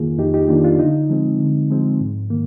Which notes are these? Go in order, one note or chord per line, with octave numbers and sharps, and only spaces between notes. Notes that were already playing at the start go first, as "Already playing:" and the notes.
Already playing: F2 D#3 A#3 F4 G#4
F2 D#4 G4
D#4 G4
D#3 A#3 D4 F4
D4 F4
D3 D#4
F3 G#3 C4
D3
F3 G#3 C4
G#2
D#3 A#3